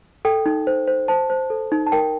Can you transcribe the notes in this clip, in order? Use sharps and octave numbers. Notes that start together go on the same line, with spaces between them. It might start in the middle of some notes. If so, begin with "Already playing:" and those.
A4 G5
D#4
C5
C5
C5 A5
C5
A4
D#4
A5
A#4 G5